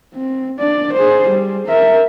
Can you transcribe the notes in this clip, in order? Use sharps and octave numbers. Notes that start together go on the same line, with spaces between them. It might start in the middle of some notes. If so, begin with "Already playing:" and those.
C4
D4 D5
G#4 C5
G3
A#4 E5